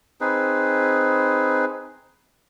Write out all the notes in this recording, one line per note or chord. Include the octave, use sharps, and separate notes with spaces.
C4 D#4 G#4 B4